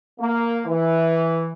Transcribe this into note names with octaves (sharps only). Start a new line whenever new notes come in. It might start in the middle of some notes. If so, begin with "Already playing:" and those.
A#3
E3